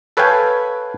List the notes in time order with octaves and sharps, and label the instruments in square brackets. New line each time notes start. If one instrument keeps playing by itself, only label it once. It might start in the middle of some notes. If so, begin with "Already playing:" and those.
[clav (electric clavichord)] A4 B4 C#5 F5 G5 G#5